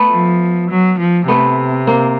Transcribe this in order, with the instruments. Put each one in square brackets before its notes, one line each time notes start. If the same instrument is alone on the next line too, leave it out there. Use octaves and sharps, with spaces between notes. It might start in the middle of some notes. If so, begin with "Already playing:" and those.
Already playing: [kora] A3 B3
[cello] F3
F#3
F3
[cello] C3 [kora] A3 B3
[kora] A#3 C4